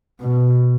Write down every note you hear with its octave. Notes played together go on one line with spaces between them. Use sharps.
B2